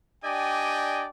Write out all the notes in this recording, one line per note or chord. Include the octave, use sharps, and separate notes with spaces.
D4 G4 D5 D#5 G5 G#5